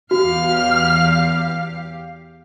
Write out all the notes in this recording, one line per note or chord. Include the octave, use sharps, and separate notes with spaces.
E2 F#4 G4 F5 F6